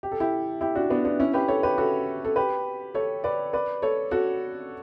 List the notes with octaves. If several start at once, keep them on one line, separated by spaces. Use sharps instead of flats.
G4
A4
E4 G4
E4 G4
D4 F#4
B3 D4
B3 D4
C#4 E4
G4 B4
A4 C#5
G4 B4
F#4 A4
A4
G4 B4
A4 C#5
B4 D5
B4 D5
A4 C#5
F#4 A4